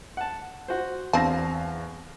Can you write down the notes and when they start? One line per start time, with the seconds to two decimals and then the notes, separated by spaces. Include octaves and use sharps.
0.17 F#5 A5
0.68 F#4 C5
1.13 E2 C4 D4 F5 A5 A#6